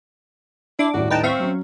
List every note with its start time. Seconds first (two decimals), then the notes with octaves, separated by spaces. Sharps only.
0.79 D4 E4 D6
0.94 D#1 A2 F#4 D5
1.10 D#4 B4 G5 A5
1.23 C4 E5 F5 C#6
1.40 F#3 C#4